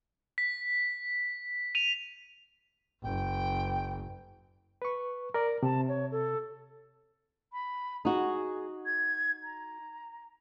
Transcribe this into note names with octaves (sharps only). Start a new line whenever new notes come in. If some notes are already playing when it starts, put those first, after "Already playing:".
B6
D#7 F7
F#1 G5
B4 C#6
A#4 D5
C3 A5
C#5
A4
B5
D#4 F#4 G#4
G#6
A#5